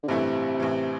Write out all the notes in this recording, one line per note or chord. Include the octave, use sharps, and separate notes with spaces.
D3
A1 G2 C3 E3 A3 E4
A1 A2 E3